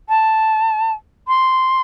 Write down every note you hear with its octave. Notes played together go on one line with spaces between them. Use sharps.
A5
C6